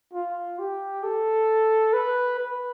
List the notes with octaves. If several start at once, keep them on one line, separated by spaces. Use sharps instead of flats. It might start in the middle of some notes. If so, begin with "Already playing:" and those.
F4
G4
A4
B4
B4